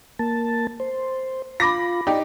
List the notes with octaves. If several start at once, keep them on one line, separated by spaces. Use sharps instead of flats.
A#3 A5
C5
F4 B5 D6 A#6
D#4 G4 D5